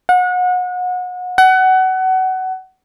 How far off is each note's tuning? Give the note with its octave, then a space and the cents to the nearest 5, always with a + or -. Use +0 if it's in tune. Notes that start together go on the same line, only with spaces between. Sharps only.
F#5 -30
F#5 +25